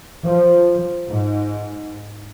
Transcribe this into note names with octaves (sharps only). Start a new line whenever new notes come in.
F3
G#2